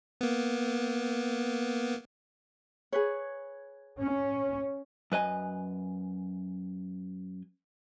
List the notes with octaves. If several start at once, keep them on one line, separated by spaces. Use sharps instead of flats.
A#3 B3
G#4 B4 C#5
C#4
F#2 B4 D#5 G#5